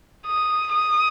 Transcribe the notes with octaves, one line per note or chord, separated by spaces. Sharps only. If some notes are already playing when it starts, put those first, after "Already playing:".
D#6
D#6